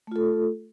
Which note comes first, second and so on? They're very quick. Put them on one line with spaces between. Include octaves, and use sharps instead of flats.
A3 F4 A4